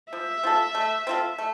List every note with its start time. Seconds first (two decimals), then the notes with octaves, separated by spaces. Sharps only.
0.12 F3 E5
0.43 C4 F4 A4
0.75 A3
1.07 C4 F4 A4
1.38 A3